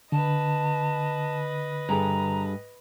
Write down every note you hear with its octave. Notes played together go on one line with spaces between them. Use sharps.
D3 B4 D#5 A5
G2 G#4 A4 A#5